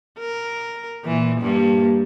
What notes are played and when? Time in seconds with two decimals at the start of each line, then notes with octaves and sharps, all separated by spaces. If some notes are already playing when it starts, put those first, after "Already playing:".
0.19 A#4
1.05 A#2 E3
1.40 G2 A#3